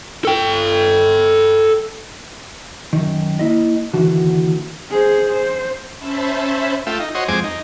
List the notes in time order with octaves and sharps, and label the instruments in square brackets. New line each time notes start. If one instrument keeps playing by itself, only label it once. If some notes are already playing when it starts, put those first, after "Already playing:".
[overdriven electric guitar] A4 G5
[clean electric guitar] F#2 D#3
A#3 E4 D#5
D#2 D3 E3 F#4
[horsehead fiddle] G#4 C5
C5
[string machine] C#4 C5 E5 A5 B5
[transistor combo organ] A3 F4 E5 G5
D#4
F#4 C5 C#5 D#5
F2 G#3 C4 G#5 D6
D#4